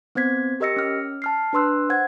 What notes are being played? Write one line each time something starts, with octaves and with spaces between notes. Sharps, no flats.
B3 C4 C5 G#6 B6
G4 A#4 D#5 E6 A#6 C#7
C#4 F6
A5 F6 C7
D4 B4 C6 E6 F#6
C5 F#5 G#6